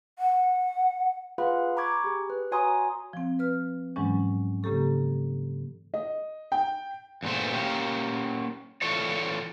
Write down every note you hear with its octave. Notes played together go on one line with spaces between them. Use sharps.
F#5
F4 G#4 B4 F5 F#5 B5
A#5 B5 C#6 D6 G#6
G4 G#4
B4
F#4 C#5 G#5 A#5 C6 D#6
F3 C4
B4 F6
G#2 E3 F#3 G#3 C#4
C#3 A#3 G4 A4 C#6
D#5
G5
E2 G2 A#2 A3 C5
A#3 C#4 G4
E3 F4 A4 C#5 D5